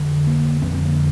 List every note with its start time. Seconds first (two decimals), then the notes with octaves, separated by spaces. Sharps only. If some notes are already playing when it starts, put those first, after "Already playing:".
Already playing: F2 D3
0.27 A#3
0.62 F2 D3 C4
0.74 C4
0.86 A#3